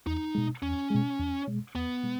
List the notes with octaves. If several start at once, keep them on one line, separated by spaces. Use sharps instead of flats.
E2 D#4
B2 G#3
E2 C#4
B2 G#3
E2
B2 G#3
E2 B3
B2 G#3